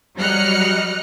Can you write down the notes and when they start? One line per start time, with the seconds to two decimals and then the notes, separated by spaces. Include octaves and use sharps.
0.17 F#3 G3 D#5 F6 F#6 C#7